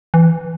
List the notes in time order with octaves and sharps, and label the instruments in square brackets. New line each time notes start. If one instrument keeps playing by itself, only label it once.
[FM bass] E3